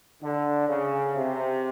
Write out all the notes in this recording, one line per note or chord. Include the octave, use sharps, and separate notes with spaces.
D3
C#3
C3